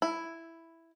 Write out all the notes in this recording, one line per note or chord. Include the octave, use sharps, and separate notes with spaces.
E4